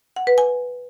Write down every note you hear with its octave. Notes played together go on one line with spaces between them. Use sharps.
F#5
B4
G#5